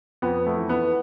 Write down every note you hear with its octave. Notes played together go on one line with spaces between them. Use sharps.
F2 B3
A3
E3
B3